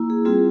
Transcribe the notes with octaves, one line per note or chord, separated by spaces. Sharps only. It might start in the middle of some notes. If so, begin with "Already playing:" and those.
Already playing: A#3 E4
G#4
G3 C4 F4 G#4